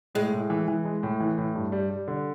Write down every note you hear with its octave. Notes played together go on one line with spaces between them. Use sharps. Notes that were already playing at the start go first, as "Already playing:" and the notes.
A2 G#3
A2
E3
E3
G#3
A2
E3
A2
G2
G3
G3
D3